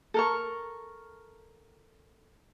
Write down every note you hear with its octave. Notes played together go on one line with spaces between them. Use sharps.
A4 A#4 C#6